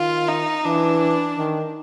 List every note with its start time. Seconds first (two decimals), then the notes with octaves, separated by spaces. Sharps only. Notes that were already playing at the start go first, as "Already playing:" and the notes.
Already playing: D#3 F4
0.28 D#4
0.65 E3 D4
1.38 D#3